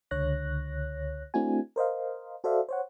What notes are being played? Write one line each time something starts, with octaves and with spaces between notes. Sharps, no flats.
C#2 D3 C#5 F#6 A#6
A3 C4 D4 E4 F#4 G#5
A#4 C5 D#5 F5
F#4 A4 C5 D5 E5 F5
C5 C#5 F#5